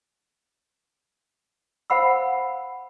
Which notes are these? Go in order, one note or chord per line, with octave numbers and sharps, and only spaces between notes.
C5 F5 F#5 B5 E6